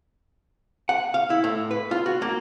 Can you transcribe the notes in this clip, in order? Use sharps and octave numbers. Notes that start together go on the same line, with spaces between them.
F#5
F5
E4
A2
B4
F4
F#4
A#3